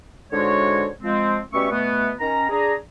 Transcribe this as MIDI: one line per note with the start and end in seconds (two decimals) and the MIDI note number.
0.32 0.86 44
0.32 0.86 50
0.32 0.86 56
0.32 0.86 66
0.32 0.86 73
1.02 1.38 53
1.02 1.38 56
1.02 1.38 60
1.52 1.67 47
1.52 1.67 55
1.52 1.67 57
1.52 1.67 61
1.52 1.67 76
1.52 1.67 85
1.71 2.11 47
1.71 2.11 57
1.71 2.11 59
2.19 2.47 51
2.19 2.47 61
2.19 2.47 82
2.50 2.73 62
2.50 2.73 68
2.50 2.73 82